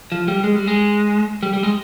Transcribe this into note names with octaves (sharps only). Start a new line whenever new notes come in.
F3
G3
G#3
G3
G#3
G3
G3
G#3